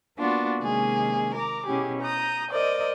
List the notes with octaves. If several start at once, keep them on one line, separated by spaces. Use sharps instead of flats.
A#3 B3 D4 F4 F#4
C3 D#3 G#3 A#3 C#4 G#4
A#4 A#5 D6
B2 C#4 E4 G4 G#4
A#5 D#6 G6
A#4 C5 D5 D#5